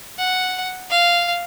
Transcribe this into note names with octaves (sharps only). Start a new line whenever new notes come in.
F#5
F5